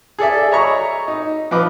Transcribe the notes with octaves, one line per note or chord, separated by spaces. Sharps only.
G#4 A4 D5 E5
C#5 D#5 E5 A#5 C#6
D#4
F3 B4 D#5 D6